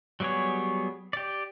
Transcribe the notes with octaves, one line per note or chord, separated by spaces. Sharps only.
F#3 G3 B3 G#4 C#5
G4 D5